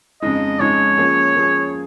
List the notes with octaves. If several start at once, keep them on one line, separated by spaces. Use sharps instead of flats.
F2 C#3 G#3 D#4 D#5
F2 C#3 G#3 D#4 C#5
F3 A#3 C#4 G#4
F3 A#3 C#4 G#4